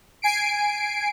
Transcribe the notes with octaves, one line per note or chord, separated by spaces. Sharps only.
G#5 C7 D7